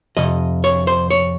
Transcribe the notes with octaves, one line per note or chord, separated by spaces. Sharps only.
F2 C3 D#5
C#5
C5
C#5